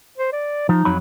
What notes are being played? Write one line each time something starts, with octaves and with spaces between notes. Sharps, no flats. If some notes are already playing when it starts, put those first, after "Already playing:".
C5
D5
F3 D#4
F2 F#3 B5